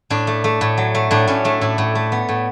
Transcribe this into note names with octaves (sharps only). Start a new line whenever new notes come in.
A2 D4
A3
A3
A2
F#3
A3
A2 D4
A2 C#4
A3 D4
A2 E4
A2
A3
B3
A2